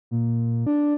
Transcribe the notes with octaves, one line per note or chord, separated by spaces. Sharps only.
A#2
D4